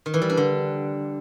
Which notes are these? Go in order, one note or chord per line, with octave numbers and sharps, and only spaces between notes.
D#3
E3
G3
D4
D3